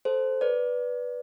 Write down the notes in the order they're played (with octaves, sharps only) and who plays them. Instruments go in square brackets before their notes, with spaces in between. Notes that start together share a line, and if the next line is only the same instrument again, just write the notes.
[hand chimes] A4 C5
B4 D5